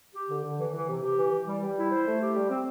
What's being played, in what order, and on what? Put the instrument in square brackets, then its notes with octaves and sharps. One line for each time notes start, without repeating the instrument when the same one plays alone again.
[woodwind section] G4
D3
D3
E3
E3
C3
G4
E3
E3
G3
G3
E4
C5
A3
G4
G3
C4